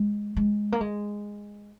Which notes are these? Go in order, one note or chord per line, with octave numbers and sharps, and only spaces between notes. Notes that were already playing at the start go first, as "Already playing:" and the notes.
Already playing: G#3
G#3
A#3
G#3